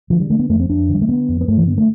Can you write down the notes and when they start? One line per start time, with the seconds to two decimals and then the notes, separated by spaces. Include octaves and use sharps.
0.10 D3 F3
0.20 G3
0.30 D3 A3
0.39 B3
0.49 F2 A3
0.60 C4
0.69 F2 D4
0.89 D3
0.94 G3
1.02 A3
1.09 D3 B3
1.29 F2
1.41 B3
1.48 G2 A3
1.58 E3
1.67 D3 B3
1.78 A3